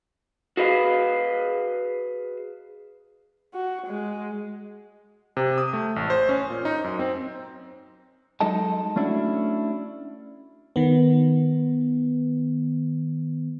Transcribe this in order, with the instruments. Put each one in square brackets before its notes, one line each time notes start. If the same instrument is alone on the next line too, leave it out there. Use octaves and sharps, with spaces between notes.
[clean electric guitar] F#4 G#4 B4 D#5 F5
[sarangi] F#4
G#3
[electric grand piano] C3
D#6
A3
A1
C5
C#4
A#2
D#4
F#2
C4
[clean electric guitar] F#3 G#3 D#4 A4 D#5 A5
A3 C#4 D4 E4 F#4
[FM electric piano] D#3 B3